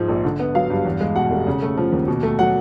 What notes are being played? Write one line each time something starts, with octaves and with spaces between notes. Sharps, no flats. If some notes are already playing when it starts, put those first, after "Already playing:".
Already playing: G#2 F3 G#3
A#1
D3
B3
F#3 F5
G2
E2
G#3
B2 F#5
F1
C#3
A3
F3
D#2
B2
A3
F#3 F#5